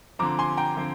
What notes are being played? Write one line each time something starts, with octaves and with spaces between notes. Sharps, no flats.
D3 F3 C4 A#5 D6
G#5 C6
G5 A#5
D3 F3 C4